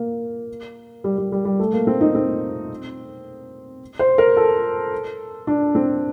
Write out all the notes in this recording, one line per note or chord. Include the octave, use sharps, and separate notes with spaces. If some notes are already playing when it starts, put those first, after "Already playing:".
Already playing: A#3
G3
G3
G3
G3
A3
A#3
C4
D#4
C4
C5
A#4
A4
D4
C4